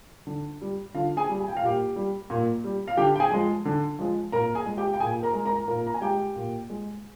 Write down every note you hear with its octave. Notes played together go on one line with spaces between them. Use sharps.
D3
G3
D3 F4 F5
G#4 G#5
G3
G#5
G5
F5
A#2 G4 G5
G3
A#2
G3
F5
D3 G4 G5
G5
G#4 G#5
F3 G#3
D3
F3 G#3
A#2 A#4 A#5
G#4 G#5
G#3
G4 G5
G5
A#2 G#4 G#5
A#4 A#5
G#3
A#4 A#5
A#2 A#4 A#5
A#5
G#5
G#3 G4 G5
A#2
G#3